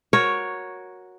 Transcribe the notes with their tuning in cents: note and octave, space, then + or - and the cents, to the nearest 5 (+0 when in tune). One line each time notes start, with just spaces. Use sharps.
F#4 -10 A#4 +5 C#5 +0